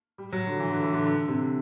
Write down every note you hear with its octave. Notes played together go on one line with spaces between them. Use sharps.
G3
F#3
D3
E3
D3
E3
D3
D3
C3